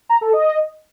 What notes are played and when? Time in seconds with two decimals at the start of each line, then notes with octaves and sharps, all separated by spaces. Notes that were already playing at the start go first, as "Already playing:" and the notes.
0.09 A#5
0.21 A4
0.33 D#5